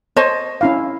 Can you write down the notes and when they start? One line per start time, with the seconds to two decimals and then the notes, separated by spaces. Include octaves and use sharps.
0.17 C5 C#5 D#5 A5
0.61 C#4 E4 F5